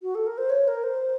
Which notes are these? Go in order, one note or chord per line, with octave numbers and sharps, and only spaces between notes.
F#4
A4
A#4
C5
C#5
A#4
C5